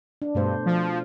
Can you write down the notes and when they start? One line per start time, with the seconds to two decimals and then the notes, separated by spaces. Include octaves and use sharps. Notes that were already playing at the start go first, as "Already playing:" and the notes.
0.22 D4
0.35 G2 B2 A3 C5
0.66 F3